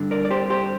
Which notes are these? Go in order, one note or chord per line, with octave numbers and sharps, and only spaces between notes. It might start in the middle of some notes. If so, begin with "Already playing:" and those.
Already playing: G2 D3
A#4 D5
D5
G4 C5
G4 C5